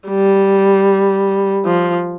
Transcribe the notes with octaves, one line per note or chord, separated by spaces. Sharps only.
G3
F3